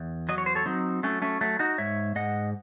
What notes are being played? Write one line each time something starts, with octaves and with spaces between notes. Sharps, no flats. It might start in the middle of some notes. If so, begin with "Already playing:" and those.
Already playing: E2
F#3 D#5
C#5
C5
A4 C#5
F#3 C4 D#4
F#3 A3 C#4
A3 C#4
F#3 A3
D#4 F#4
G#2 C#5 E5
G#2 D#5 F#5